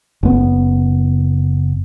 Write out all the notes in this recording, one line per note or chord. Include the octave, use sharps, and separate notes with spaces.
F#1 B3